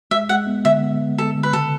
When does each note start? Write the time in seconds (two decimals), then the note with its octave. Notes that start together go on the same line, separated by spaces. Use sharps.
0.11 G#3 E5
0.29 G#3 F#5
0.47 B3
0.65 D3 E5
0.83 B3
1.00 B3
1.18 G#3 A4
1.35 D3
1.43 B4
1.53 C#3 A4